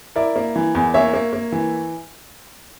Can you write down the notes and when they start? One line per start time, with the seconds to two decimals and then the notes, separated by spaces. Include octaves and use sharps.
0.16 E4 A#4 D5
0.36 A#3
0.56 E3
0.75 E2
0.94 A#3 C#5 E5
1.14 A#3
1.33 A#3
1.52 E3